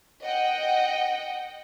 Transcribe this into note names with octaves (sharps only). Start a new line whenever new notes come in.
D#5 F#5 G5